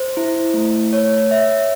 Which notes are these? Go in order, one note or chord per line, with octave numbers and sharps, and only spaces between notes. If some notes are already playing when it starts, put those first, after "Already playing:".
Already playing: C5
E4
A3
C#5
E5